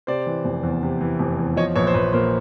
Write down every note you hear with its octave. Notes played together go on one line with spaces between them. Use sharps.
C3 C5 D5
E3
F1
E2
C3
E3
F1
E2
F3 C#5 D#5
A#1 B4 C#5
C5
A#1 B4
A#2 A#4 C5